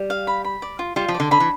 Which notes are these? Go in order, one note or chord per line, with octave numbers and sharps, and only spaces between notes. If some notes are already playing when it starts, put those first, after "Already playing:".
Already playing: G3
F5
B5
B5
D5
F4
G3 F4
F3
D5
D3
D3 B5
E3